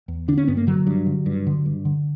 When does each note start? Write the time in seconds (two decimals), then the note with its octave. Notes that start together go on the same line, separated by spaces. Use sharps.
0.08 E2
0.28 D3 D4
0.37 C#4
0.47 G2 B3
0.57 A#3
0.67 D3 F#3
0.87 G2
1.06 D3
1.26 G2
1.47 D3
1.66 G2
1.85 D3